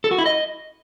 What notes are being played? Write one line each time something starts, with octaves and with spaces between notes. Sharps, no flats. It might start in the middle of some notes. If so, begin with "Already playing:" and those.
A4
F#4
E4
D#5